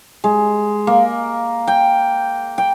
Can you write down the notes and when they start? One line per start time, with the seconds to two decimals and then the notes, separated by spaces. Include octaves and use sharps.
0.24 G#3
0.87 A#3
1.68 G5
2.58 G5